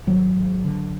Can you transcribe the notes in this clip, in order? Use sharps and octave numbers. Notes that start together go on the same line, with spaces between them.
G#1 F#3
G#1
D3